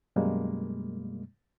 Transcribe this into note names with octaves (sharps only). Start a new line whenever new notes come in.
F#2 B2 G3 G#3 A#3